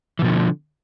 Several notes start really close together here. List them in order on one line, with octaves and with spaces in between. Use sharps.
E3 B2 F3 D3